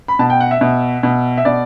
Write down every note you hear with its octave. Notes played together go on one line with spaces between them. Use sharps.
B5
B2 A5
G5
F#5
E5
B2
B2
E5
B2 D5